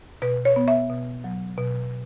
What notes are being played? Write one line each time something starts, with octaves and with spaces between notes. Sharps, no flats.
B2 B4
C#5
B3
E5
B2
F#3
B2